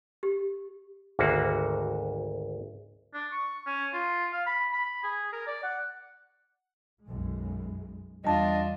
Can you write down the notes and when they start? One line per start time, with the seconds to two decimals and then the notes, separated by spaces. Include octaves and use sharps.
0.23 G4
1.19 G#1 D2 A#3 F#4
3.14 D4
3.32 C#6
3.66 C#4
3.93 F4
4.33 F5
4.47 B5
4.72 B5
5.04 G#4
5.33 A#4
5.47 D5
5.64 F#5
7.06 B1 F#2 G#3
8.25 E2 G3 D4 F4 D#5 A5